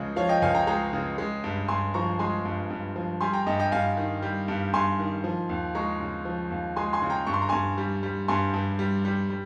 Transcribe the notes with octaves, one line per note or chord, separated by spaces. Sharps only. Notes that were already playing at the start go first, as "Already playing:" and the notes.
Already playing: C#2 C#3 F3 G#3
F3 C#5 F5
D#5 G5
C#2 F5 G#5
G5 A#5
G#3 G5 A#5
C#3
G#3
G2
G2 G#5 C6
F3 A#5 C#6
G#3 G#5 C6
G2
G2
F3
G3 G#5 C6
G5 A#5
G2 D#5 G5
D#5 G5
G2 F5 G#5
D#3
G3
G2
G2 G#5 C6
D#3
F3
D#2
G#3 A#5 C#6
C#3
F3
D#2
G#3 G#5 C6
G#5 C6
C#3
G5 A#5
G2 C#6
C6
A#5
G2 G#5 C6
G3
G3
G2 G#5 C6
G2
G3
G3
G3